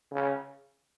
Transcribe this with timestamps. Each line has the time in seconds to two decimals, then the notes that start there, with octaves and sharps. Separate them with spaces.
0.12 C#3